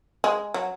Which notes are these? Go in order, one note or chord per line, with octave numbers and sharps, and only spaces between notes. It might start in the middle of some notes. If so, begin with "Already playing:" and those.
G#3
F#3